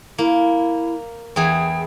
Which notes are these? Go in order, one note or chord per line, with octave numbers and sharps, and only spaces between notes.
A#3 E4
E2 E3 G#4 G5